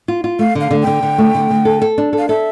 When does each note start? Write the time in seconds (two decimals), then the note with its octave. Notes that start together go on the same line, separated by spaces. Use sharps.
0.08 F4
0.24 F4
0.39 A3 F5
0.55 D3
0.61 F5
0.71 D3
0.82 D3 G5
1.03 D3
1.18 A3
1.35 D3
1.50 D3
1.65 A4
1.82 A4
1.98 D4
2.13 A4
2.18 F5
2.29 A4 E5